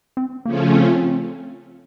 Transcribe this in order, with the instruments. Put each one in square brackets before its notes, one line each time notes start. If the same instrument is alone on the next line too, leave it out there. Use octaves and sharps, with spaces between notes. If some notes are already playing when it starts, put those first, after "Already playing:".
[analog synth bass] C4
[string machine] C#3 F3 A3 C#4 F4 [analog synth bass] A#3
[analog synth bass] C4